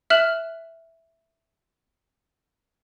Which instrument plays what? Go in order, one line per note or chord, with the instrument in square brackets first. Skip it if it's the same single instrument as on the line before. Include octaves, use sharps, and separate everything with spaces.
[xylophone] E5 F6 F#6 E7 F#7